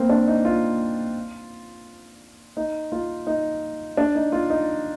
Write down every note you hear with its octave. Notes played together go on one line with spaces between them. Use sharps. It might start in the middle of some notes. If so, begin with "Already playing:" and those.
Already playing: A#3 C4
D4
D#4
F4
D#4
F4
D#4
D4
D#4
F4
D#4